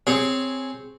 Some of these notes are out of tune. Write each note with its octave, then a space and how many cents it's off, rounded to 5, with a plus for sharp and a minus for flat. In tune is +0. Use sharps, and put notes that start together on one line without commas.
C4 -5 G#4 +0 C#5 -10